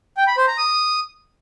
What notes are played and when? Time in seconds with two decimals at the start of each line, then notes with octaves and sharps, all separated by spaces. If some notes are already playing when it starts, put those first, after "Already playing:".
0.17 G5
0.27 B5
0.37 C5
0.48 A#5
0.58 D#6